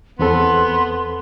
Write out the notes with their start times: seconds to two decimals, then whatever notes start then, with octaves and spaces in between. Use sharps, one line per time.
0.19 E2 B3 C4 A4 C6